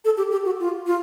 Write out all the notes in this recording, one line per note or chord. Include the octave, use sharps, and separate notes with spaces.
A4
G4
G4
F#4
F4
F4